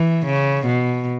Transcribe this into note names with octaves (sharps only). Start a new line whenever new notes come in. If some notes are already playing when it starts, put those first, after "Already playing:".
Already playing: E3
C#3
B2